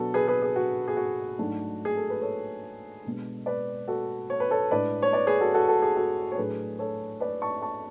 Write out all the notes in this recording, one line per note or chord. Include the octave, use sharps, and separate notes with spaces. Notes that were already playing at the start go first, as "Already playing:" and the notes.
Already playing: B2 F#3 B3 D4 F#4 A4
G#4 B4
G#4 B4
G#4
F#4
G#4
F#4
G#2 F#3 A3 D4
G#4
A4
B4
A4 C#5
B2 G#3 D4
B4 D5
F#4 A4
C#5
B4
A4 C#5
A2 G#3 D4 B4 D5
C#5
B4 D5
G#4 B4
F#4 A4
F#4 A4
F#4 A4
G#4
F#4 A4
C#5
A2 F#3 A3 D4 G#4 B4
A4 C#5
B4 D5
A5 C#6
A5 C#6